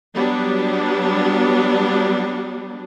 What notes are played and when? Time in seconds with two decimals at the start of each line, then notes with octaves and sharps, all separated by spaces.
0.13 F#3 G3 B3 D4